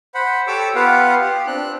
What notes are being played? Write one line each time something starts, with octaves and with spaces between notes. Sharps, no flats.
C5 F#5 B5
G4 A4 C#5 D6 E6
B3 F4 G4 B4 F5 F#5
G4
C4 D4 F#6